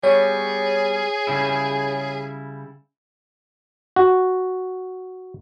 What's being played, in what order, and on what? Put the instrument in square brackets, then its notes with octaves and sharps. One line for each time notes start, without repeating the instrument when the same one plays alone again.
[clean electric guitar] G3 B3 [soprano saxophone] G#4 [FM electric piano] C#5
[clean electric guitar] C#3 G3 E4
[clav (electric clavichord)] F#4